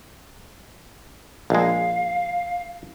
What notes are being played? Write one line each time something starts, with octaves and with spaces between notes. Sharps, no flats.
A#1 G#3 F5